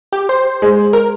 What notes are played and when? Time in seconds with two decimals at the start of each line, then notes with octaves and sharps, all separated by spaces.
0.12 G4
0.29 C5
0.62 G#3
0.93 A#4